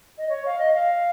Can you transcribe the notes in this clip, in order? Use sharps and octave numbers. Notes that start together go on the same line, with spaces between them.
D#5
C#5
F5
D#5
F5